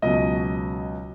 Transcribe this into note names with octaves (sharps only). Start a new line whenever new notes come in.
C#2 B2 F#3 C#4 D#5